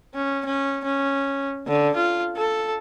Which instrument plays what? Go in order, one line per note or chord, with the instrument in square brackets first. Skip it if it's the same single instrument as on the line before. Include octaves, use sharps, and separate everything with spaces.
[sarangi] C#4
C#4
C#4
D3
F4
A4